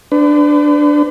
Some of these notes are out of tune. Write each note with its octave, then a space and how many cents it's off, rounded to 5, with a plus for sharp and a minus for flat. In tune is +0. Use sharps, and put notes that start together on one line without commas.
D4 +0 B4 +45